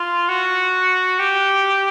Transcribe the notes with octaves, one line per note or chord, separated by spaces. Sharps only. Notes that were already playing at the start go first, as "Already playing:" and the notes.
Already playing: F4
F#4
G4